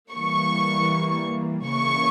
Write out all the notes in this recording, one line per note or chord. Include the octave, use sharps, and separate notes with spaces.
E3 G3 A#3 C#6
C#3 E3 A#3 C#6